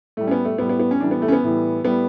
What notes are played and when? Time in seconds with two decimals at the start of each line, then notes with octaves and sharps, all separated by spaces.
0.17 A2 G3 A3
0.28 C#4
0.31 B3
0.45 A3
0.58 A2 G3 B3
0.69 B3
0.80 B3
0.91 C#4
1.00 A2 E3 G3 D4
1.11 B3
1.22 A3
1.28 C#4
1.32 B3
1.43 A2 E3 G3
1.84 A2 G3 B3